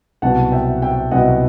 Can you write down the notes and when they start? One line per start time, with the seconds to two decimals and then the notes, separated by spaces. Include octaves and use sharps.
0.22 C2 B2 F#3 B3 F#5 A5
0.52 E5 G5
0.82 E5 G5
1.11 C2 B2 F#3 B3 D#5 F#5